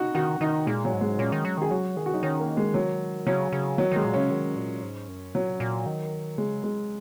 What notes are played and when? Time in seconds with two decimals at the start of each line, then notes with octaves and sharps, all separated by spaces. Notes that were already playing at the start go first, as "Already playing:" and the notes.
Already playing: D#4 F#4
0.15 D#3 F#4
0.41 D#3 D#4
0.66 A#2 G#3
0.85 F#3
0.93 G#2
1.01 G#3
1.18 A#2 C#4
1.32 D#3
1.45 F#3
1.58 D#3 G#4
1.71 F#3 F#4
1.97 D#3 G#4
2.06 F#4
2.14 F#3 D#4
2.23 D#3 C#4
2.40 A#3
2.57 G#3
2.74 F#3
3.27 C#3 F#3
3.52 C#3
3.78 D#3 F#3
3.92 D#3 G#3
4.05 A#2
4.14 C#3 C#4
4.30 D#3
4.56 A#2
4.83 G#2
5.08 F#2
5.35 A#2 F#3
5.60 A#2
5.86 D#3
6.38 C#3 G#3
6.64 G#3